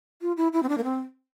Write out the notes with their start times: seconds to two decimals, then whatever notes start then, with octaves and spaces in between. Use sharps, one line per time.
0.22 F4
0.37 E4
0.53 E4
0.63 C4
0.69 D4
0.78 A#3
0.84 C4